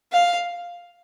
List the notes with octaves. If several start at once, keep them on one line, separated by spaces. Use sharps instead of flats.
F5